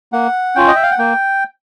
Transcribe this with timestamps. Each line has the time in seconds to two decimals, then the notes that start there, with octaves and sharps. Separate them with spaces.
0.13 A#3 F#5
0.56 C#4 F4 G5
0.67 D#5
0.75 E5
0.83 F5
0.91 F#5
0.98 A#3 G5